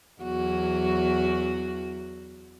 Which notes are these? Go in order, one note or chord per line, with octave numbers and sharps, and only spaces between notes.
E2 F#3 F#4